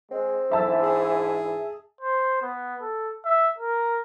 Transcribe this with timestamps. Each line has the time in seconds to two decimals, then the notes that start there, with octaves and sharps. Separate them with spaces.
0.11 G#3 C4
0.52 G#2 E3 D4 E5 A5 E6
0.82 G#4
2.01 C5
2.42 B3
2.82 A4
3.25 E5
3.58 A#4